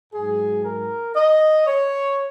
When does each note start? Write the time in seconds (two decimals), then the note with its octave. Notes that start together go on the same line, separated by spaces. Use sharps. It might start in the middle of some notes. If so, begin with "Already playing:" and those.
0.13 G#2 F#3 G#4
0.65 A#4
1.15 D#5
1.67 C#5